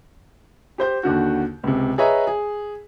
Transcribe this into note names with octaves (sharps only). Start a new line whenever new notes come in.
G4 C5 G6
D#2 D3 F#4
C#2 C3
G#4 B4 C#5 D#5 E5 A#5
G#4